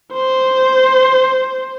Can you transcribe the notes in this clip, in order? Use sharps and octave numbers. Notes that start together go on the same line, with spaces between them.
C5